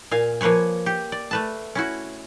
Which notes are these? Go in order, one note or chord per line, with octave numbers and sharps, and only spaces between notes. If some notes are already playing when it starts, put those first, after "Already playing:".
A#2 F5 G#5
F3 A#3 B4 C#5 G#5
G4
D5
A3 B4 A5
C#4 E4 F#4